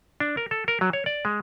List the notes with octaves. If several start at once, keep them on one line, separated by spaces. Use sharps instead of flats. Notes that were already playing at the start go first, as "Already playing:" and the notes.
D4
A#4
A4
A#4
F#3
C#5
D5
G#3